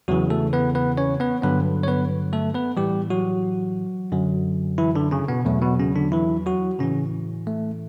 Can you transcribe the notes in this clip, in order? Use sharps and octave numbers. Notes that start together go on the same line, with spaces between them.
E2 C#3 E3 F#3 F#4
A3 A4
B3 B4
B3 B4
C#4 C#5
B3 B4
G2 D3 F#3 B3 B4
C#5
B3 B4
A3 A4
B3 B4
A2 E3 G3 G4
F#3 F#4
F#2 D3 F#3
E3 E4
D3 D4
C#3 C#4
B2 B3
E2 B2 F#3 A3
B2 B3
C#3 C#4
D3 D4
E3 E4
F#3 F#4
A2 C#3 E3 C#4
A3